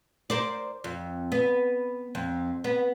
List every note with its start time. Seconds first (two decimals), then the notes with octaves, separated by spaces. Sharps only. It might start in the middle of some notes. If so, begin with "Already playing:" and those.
0.30 A#4 C5 D5
0.84 F2
1.32 B3
2.15 F2
2.64 B3